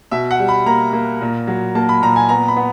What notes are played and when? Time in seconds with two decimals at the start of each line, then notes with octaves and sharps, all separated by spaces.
0.11 B2 E5
0.31 F#5
0.39 G3
0.48 B5
0.66 A#3 A#5
0.93 A#3
1.21 A#2
1.47 F#3
1.75 A#3 A5
1.89 B5
2.02 A#2 A#5
2.16 G#5
2.29 B3 A#5
2.48 B5
2.57 B3